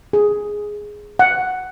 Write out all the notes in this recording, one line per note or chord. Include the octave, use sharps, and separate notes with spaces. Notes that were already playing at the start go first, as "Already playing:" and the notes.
G#4
F#5